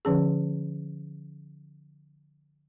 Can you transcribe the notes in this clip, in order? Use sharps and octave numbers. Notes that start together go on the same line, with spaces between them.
D3 F3 C#4 G#4